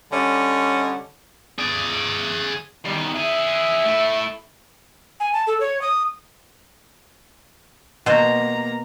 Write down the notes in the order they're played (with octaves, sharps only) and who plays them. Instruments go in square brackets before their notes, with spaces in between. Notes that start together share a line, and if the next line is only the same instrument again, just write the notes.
[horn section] D3 G3 C#4 D#5
[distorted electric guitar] G#4 D5
[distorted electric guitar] E2 D#3 [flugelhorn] G3
[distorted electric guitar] E4 G#4 [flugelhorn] E5
[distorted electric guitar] A3 E4
[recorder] G#5
A5
A4
C#5
D#6
[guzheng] B2 C5 [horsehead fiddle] A#3 A#5